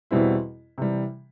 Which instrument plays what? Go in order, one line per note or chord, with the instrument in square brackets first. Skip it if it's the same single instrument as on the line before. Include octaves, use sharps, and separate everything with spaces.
[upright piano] E2 B2 G3 C4 E4
C3 E3 G3